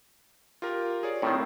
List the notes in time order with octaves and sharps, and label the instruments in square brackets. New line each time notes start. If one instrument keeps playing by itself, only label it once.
[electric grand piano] F4 G4 A#4
G#4 C#5 D5
[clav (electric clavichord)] A2 D#3 [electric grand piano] C4 E4 C5